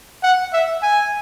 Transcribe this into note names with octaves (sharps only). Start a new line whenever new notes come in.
F#5
E5
G#5